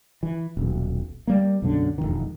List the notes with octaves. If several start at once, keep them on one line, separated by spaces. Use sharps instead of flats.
E3
D#1 B1
G3 A#3
B1 F#2 D3
E1 B1 F2 D#3